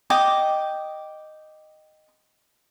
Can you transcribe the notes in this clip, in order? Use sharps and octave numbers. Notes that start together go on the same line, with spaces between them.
D#5 G5 D6